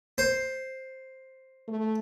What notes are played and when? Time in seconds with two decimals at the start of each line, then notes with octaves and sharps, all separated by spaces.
0.18 C5
1.68 A3